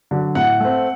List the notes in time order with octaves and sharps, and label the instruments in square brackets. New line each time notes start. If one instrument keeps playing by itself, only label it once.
[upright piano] D3 F#3
A2 F#5
A3 C4